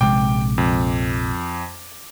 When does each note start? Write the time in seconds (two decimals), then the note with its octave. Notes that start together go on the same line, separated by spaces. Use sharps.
0.01 A#1 C3 G#3 G5 D6
0.58 F2